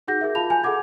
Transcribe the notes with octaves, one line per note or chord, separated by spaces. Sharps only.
D#4 F#4 G#4 F#5 G6 A#6
G#4 A#4 E5
F4 F5 A5 B5 F7
G#5 G6
G#4 A4 F#5 D6 G#6